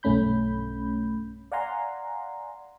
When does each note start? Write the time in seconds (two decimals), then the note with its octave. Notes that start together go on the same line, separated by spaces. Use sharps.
0.03 B1 G2 A3 C#4 B5 G6
1.52 D5 F5 F#5 G#5 A#5 C6